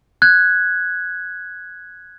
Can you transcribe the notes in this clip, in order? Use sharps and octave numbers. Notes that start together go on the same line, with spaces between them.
F#6 G#6